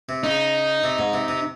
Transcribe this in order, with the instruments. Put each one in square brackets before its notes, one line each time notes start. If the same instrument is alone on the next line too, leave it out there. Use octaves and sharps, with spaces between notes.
[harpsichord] C3
[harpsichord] C#3 [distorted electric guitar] D#4
[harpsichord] C3
G#2
C3
C3